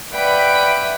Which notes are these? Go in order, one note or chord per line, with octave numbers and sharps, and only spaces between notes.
B4 D5 E5 F#5 G5 B5